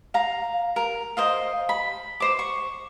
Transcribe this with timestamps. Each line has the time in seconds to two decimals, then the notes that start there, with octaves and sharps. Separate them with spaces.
0.14 F5 A#5
0.76 A#4
1.17 C5 D#5 F5
1.69 B5
2.20 C5 D6
2.39 C#6